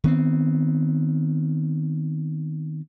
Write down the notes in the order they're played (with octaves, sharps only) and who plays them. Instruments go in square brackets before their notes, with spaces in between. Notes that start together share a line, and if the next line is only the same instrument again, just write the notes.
[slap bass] D#3 B3 C4